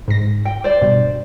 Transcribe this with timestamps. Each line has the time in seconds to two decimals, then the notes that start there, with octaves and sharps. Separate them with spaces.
0.08 G#2 A#6
0.45 G5
0.64 C5 D5
0.81 G2 B2